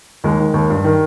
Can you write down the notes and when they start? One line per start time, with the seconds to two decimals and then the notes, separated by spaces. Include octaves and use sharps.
0.24 D#2 G#3
0.40 D#3
0.54 D#2
0.70 G2
0.84 D#3